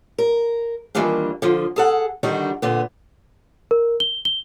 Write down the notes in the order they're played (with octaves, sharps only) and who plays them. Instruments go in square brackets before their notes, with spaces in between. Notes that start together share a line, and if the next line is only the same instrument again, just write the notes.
[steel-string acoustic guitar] A#4
D#3 E3 G3 A#3 D4 F4
D3 F3 F4
G#4 A4 F#5
D3 D#3 G3 D4 D#4 F#4
A#2 D3 B3
[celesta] A#4
G7
G7